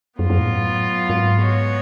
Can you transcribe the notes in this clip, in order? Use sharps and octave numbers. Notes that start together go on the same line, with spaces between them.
F#2 F#3 B3 F4
F#2
A2
G#2
G#3 B3 F#4 C#5